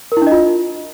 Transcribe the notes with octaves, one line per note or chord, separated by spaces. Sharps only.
A#4
E4
D4
D#5
F4